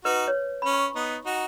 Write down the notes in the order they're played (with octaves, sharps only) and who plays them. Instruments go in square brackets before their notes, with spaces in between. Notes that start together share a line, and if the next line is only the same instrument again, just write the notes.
[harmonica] D#4 F#4 [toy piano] B4
[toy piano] C#5
[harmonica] C#4 [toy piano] B5
[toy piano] C#6
[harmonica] B3 D#4
D#4 F#4